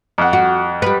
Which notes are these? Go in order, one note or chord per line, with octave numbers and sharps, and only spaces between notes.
F2 F#5
F#4
G3 B4